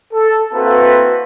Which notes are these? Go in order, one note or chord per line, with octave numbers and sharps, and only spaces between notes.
A4
A#3 C4 E4 F#4 A4 B4